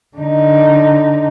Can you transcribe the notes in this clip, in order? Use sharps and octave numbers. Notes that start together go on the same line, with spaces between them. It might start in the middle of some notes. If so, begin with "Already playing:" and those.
D3 D#4